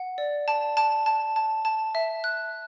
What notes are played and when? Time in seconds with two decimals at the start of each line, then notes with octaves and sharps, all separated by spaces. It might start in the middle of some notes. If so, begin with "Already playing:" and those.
Already playing: F#5
0.18 D5
0.48 A5
0.77 A5
1.06 A5
1.36 A5
1.65 A5
1.95 E5
2.24 F#6